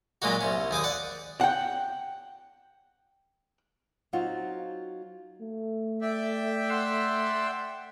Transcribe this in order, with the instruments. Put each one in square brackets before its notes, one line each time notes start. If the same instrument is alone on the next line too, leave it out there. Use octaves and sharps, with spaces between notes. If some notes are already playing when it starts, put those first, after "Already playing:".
[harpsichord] A#2 F#3 G#3 A#3 F#4
C2 C#4
D#2 G#4 D6 D#6
D5 F#5
[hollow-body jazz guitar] F#5 G5
[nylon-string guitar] F#3 C4 D#4 F4 F#4
[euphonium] A3
[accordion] D5 E5 G5
[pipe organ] F#5 C6 E6